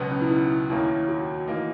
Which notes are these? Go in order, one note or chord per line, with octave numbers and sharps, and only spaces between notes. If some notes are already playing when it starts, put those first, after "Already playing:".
Already playing: C#2 B2 F#3 B3
C#4
E4
D#4
D#2 D#3 A#3 C#4 E4
F#4
E3 A#3 D#4